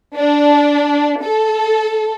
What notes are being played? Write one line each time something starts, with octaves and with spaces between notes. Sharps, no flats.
D4
A4